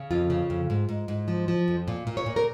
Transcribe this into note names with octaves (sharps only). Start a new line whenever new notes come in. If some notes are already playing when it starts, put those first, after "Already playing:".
Already playing: C#3
F2 F4
C#3
F2
G#2
G#2
G#2
F3
F3
F2
A#2
A#2
C#5
A#2
A#4